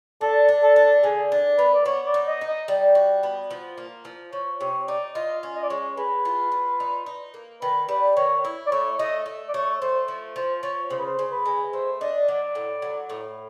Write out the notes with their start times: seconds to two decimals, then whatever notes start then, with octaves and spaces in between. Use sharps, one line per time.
0.21 D4 A4
0.49 D4
0.63 A4
0.76 D4
1.04 D3 G#4
1.32 D4
1.58 A#3 B4
1.74 D5
1.86 B3 C#5
2.06 D5
2.14 D#4
2.27 D#5
2.41 D#4
2.48 D#5
2.68 G3
2.95 F#4
3.23 B3
3.51 F3
3.78 A#3
4.05 F3
4.33 F3 C#5
4.60 C3 C#5
4.88 D#4 D5
5.15 F4 D#5
5.43 C#4
5.55 D#5
5.63 D5
5.70 G#3 C#5
5.97 G#3 B4
6.25 F4
6.52 F4
6.80 D#4
7.06 D#4
7.34 A#3
7.62 D#3 B4
7.89 G3 B4
8.16 D#3 C#5
8.45 E4
8.67 D5
8.71 A3 C#5
8.99 A3 D#5
9.26 A3
9.49 D5
9.54 A3 C#5
9.81 A3 C5
10.08 F3
10.36 F3 C5
10.63 F3 C#5
10.90 C#3 C5
10.99 B4
11.06 C5
11.19 C#3
11.32 B4
11.46 G#3
11.73 A3 C5
12.01 D4 D#5
12.28 F#3 D5
12.55 A2
12.82 F#3
13.10 A2